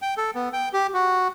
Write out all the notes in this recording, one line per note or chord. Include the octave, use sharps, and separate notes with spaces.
G5
A4
B3
G5
G4
F#4